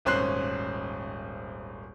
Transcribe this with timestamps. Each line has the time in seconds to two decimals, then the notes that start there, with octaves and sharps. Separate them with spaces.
0.05 D#1 G#1 C#4 C5 F#6 C7